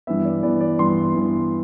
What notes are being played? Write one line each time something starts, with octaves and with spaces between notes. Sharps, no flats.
G2 E3 B3 E5
D5
G2 E3 B3 D5
D5
G2 E3 B3 C6
G2 E3 B3